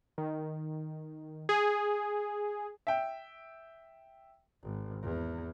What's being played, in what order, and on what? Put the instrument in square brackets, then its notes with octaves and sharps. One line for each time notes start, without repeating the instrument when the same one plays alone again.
[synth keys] D#3
G#4
[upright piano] E5 G5
[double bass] G#1
E2